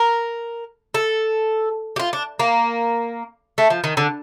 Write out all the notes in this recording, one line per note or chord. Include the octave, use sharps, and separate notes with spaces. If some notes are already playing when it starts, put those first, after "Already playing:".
Already playing: A#4
A4
G4
F4
D4
A#3
A3
F3
D#3
D3